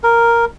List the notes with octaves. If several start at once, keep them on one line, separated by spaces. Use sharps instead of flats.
A#4